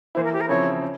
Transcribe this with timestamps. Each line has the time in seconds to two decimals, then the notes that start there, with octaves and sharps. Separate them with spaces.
0.15 E3 A#3 E4 C5
0.24 A#4
0.32 G4
0.40 A#4
0.48 C#3 F3 C4 E4 C#5
0.82 C#4